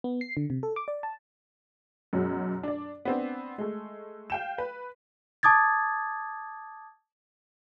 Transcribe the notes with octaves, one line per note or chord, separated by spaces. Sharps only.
B3
C7
D3
C3
A4
D6
D5
A5
F#2 B2 F#3 G#3
D4 D5
B3 C4 D4
G#3 A3
F5 G5 E7
B4
A5 D6 D#6 G#6 A6